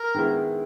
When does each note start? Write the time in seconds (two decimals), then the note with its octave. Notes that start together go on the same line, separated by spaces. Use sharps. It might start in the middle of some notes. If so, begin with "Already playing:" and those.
Already playing: A#4
0.14 D#3 G#3 B3 E4